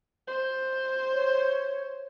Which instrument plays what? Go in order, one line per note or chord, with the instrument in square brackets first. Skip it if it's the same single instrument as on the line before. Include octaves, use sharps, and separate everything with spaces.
[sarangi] C5
[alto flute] C#5